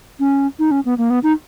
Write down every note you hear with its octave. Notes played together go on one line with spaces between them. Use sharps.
C#4
D#4
C#4
B3
A#3
B3
D#4